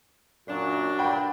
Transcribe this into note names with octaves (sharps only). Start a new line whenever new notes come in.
F#2 A#2 F#3 D4 F#4
G2 A#2 F#5 G5 B5